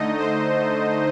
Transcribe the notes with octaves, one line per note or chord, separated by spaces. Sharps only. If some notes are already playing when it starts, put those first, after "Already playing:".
Already playing: D3 A3 D#4 D#5
C5